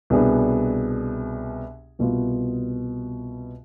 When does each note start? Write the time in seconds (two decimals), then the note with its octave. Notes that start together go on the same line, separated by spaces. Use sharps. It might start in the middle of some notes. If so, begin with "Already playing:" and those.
0.10 C2 B2 B3 D4 G#4
1.99 C2 B2 B3 F4